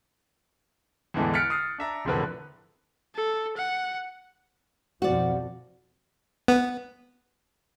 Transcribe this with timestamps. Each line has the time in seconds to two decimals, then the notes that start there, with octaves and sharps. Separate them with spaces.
1.14 E2 A2 D3 E3 G#3 D4
1.34 F6 F#6 A6 B6 C#7 D7
1.50 D#6 F6 A6 C7
1.78 D4 E5 A#5
2.05 E1 F2 A2 D3 A#4 B4
3.15 A4
3.57 F#5
5.02 F2 B2 F3 F#4 D5
6.48 B3